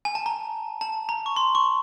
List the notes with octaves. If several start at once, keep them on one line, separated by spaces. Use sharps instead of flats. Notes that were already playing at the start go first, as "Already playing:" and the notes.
G#5
A5
A#5
A5
A#5
C#6
C6
C#6